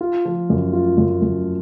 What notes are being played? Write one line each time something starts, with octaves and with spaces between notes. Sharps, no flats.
F4
F3
F#2
F4
F#2
F#2